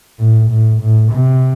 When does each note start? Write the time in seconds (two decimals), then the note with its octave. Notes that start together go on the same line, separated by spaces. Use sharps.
0.19 A2
0.50 A2
0.81 A2
1.12 C3